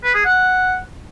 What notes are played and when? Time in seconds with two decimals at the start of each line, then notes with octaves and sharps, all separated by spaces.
0.04 B4
0.14 G#4
0.25 F#5